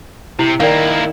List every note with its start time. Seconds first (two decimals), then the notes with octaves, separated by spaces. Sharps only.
0.39 C3 E4
0.60 D#3 A#3 E4 D5 F5